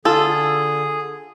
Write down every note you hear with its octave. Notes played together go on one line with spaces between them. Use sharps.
D3 F4 G#4 A4